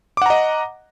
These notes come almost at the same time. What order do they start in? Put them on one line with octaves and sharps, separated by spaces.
D6 F#5 A#5 D#5